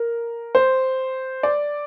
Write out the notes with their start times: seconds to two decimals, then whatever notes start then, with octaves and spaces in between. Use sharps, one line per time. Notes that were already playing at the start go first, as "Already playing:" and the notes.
Already playing: A#4
0.55 C5
1.43 D5